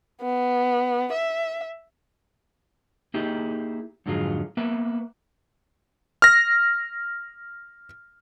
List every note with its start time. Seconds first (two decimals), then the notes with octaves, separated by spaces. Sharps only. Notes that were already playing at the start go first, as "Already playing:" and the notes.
0.22 B3
1.13 E5
3.14 A#3 D#4 E4 G4 G#4
4.06 F2 G#2 D3 F#3 F4 G#4
4.57 A#3 B3 B4 E5
6.22 F6 A#6